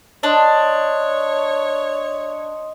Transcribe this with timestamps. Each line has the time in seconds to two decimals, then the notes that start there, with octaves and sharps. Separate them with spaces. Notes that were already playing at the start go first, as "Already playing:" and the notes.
0.23 D4 C#5 D#5 C6 D#6